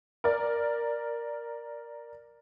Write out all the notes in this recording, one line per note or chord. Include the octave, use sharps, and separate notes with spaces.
A#4 D5